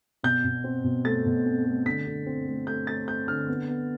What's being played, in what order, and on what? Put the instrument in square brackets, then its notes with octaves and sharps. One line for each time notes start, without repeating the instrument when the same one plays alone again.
[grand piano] B2 G6
B2
C4
B2
A3 A6
B2
C4
A3
D3 B6
D3
C4
A3
A3 G6
A3 A6
C4 G6
D3 F6
B3
B3